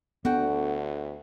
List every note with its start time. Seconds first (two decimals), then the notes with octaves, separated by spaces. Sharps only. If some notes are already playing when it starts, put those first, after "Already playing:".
0.25 D2 D3 B3 F#4 F#5 G5